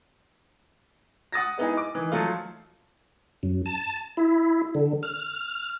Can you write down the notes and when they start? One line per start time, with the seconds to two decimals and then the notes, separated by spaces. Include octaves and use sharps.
1.32 F#5 D#6 A6 A#6
1.58 G#3 B3 D#4 E4 G#4
1.77 D6
1.95 D#3 E3
2.12 F3 F#3 A3 F4
3.43 F#2
3.66 A5
4.17 E4
4.75 D3
5.03 F6